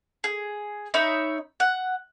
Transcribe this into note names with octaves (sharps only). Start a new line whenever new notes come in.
G#4
D#4 C#5 E5 B5
F#5